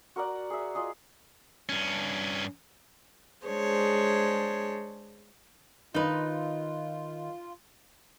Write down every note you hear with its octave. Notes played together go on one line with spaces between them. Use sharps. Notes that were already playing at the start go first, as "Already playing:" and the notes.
F#4 A#4 D5 F#5
G#4 E5
F4 G#4 D#5
G2 C#4
G#3 D4 G#4 C5 C#5
D#3 D#4 F4 B4 D#5